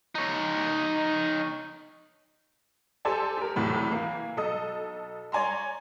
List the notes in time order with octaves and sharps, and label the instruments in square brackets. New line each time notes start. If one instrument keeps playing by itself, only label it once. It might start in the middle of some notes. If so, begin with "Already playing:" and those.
[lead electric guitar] D#4 C#5
[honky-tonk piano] G4 A4 C5 D5 G#5 A5
G4 A#4
B1 E2 A2 C3
E3 A#3
B1 A4 D#5 D#6
C#5 D5 G#5 A#5 C6